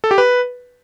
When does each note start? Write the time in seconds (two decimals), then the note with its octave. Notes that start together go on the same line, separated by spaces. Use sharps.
0.04 A4
0.11 G4
0.18 B4